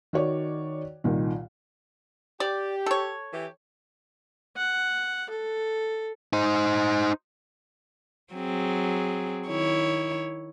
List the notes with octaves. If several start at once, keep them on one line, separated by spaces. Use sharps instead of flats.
D#3 F#4 C#5 D5
C2 A#2 D#3
G4 D5
A4 C#5
E3 G4
F#5
A4
D#4 C5
F#3 C4 G#4
D#3 E4 C#5